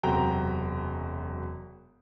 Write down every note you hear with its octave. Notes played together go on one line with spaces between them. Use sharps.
E1 F#2 C3 F#4 G5 A#5